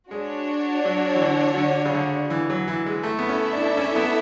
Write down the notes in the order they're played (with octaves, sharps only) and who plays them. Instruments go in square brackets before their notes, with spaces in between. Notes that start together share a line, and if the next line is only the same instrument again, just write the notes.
[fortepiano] G#3 [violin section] D4 F#4 C#5
[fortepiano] F#3
E3
D3
D3
C#3
D3
E3
F#3
E3
G#3
[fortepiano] A3 [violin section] E4 A4 E5
[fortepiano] B3
C#4
D4
D4
C#4
B3